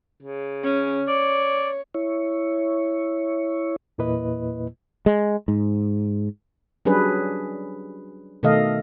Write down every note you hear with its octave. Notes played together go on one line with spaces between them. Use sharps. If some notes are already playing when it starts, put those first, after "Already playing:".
C#3
C#4
C#5 D5
E4 C#5
E2 A#2 A#3 E4 B4 D#5
G#3
G#2
F#3 G3 C#4 D4 G#4 B4
B2 D#3 A3 A4 D#5 F5